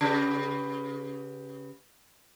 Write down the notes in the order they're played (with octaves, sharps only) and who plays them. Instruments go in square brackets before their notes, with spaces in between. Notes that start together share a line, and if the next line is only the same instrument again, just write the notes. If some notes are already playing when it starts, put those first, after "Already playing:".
[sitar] C#3 G4 B4